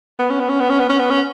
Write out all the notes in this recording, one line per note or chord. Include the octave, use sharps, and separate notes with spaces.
B3
C#4
B3
C#4
B3
C#4
B3
C#4
B3
C#4